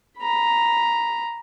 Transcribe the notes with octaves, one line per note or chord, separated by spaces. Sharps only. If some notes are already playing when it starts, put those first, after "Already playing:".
A#5 B5